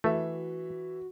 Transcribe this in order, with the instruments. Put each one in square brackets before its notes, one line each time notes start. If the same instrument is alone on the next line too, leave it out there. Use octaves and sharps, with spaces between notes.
[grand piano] E3 E5 [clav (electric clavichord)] A3 [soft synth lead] F#4